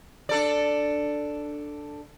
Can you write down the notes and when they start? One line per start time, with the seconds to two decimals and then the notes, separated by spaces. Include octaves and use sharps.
0.29 D4 A4 D5